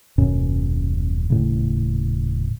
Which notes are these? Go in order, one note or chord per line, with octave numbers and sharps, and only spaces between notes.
D#1 F#2 B2 C#4
D#1 A2 C#3